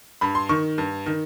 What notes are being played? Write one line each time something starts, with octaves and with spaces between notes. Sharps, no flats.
G2 B5
C6
D#3 C#6
G2
D#3